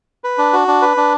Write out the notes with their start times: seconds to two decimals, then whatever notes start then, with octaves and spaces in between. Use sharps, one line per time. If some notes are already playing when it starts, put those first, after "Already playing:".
0.24 B4
0.38 D4
0.53 F#4
0.68 D4
0.82 B4
0.97 D4